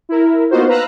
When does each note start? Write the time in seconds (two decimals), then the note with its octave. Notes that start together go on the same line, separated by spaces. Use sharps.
0.09 E4 A#4
0.51 A#3 B3 D#4 F4 F#4 C5
0.68 B4 F5 A#5 E6 F#6